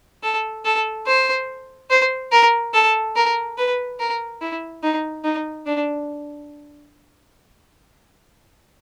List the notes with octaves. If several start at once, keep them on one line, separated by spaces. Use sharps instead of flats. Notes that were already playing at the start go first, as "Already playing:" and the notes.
A4
A4
C5
C5
A#4
A4
A#4
B4
A#4
E4
D#4
D#4
D4